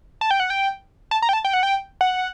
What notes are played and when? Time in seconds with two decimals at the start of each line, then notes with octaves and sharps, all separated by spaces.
0.21 A5
0.31 G5
0.40 F#5
0.50 G5
1.11 A5
1.22 A#5
1.29 G5
1.33 A5
1.45 G5
1.53 F#5
1.63 G5
2.01 F#5